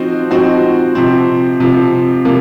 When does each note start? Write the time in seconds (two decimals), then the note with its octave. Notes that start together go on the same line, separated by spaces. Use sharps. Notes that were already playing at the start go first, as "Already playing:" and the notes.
Already playing: F3 C4 D#4 F#4
0.31 F3 C4 D#4 F#4
0.95 C3 F3 C4
1.60 C3 F3 C4
2.25 C3 F3 A#3